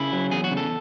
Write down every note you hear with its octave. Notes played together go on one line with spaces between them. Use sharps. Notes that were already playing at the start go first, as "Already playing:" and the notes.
Already playing: C#3 E4
F#3
E2 G#4
F#4
C#3
A4